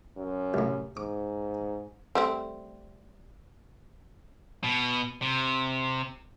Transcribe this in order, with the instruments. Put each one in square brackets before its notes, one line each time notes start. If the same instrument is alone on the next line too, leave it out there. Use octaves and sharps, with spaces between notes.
[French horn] F#2
[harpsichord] C2 A2
[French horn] G#2 [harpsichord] D6
[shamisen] G3 A3 C4
[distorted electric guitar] B2
C3